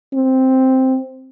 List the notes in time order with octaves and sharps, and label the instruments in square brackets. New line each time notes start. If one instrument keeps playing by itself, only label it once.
[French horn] C4